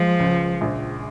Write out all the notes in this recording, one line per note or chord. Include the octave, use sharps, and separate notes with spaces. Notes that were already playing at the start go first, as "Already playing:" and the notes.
Already playing: F3 G#3
C#2
A#1